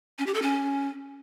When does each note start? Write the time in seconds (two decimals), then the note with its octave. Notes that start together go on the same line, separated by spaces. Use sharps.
0.19 C#4
0.26 G4
0.34 A4
0.42 C#4